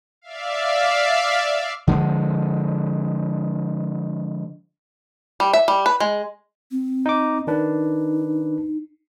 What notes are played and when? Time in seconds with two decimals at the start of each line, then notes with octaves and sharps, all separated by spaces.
0.22 D5 E5 F5
1.87 D3 F3 G3 G#3
5.40 G3
5.53 E5
5.68 G3
5.86 B4
6.00 G#3
6.71 C4
7.06 D#4 D6
7.47 D#3 D4 D#4 B4